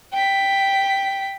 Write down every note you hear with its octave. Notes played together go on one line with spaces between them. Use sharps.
G5 B6